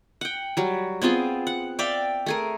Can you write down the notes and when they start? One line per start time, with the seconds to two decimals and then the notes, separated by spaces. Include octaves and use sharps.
0.21 F#5 G5
0.57 F#3 G3
1.02 B3 C4 F4 G#4
1.47 F#5
1.79 D5 E5 F5 G5
2.26 A3 G#4 A#4